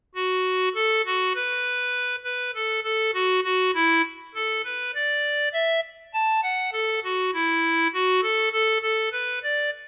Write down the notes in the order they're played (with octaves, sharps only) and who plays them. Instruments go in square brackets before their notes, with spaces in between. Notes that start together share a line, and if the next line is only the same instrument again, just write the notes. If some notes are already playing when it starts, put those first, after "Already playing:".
[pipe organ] F#4
A4
F#4
B4
B4
A4
A4
F#4
F#4
E4
A4
B4
D5
E5
A5
F#5
A4
F#4
E4
F#4
A4
A4
A4
B4
D5